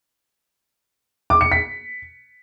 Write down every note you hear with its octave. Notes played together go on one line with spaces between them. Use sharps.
D6
C#7
B6